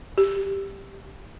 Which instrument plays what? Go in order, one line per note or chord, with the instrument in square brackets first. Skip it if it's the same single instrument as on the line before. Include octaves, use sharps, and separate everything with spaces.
[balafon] G4